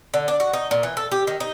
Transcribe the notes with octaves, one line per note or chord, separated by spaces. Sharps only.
D3
D4
F#4
D#4
A#2
E3
A4
G4
D#3
D#4